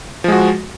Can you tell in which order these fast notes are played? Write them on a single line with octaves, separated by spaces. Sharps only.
F3 G#3 F#4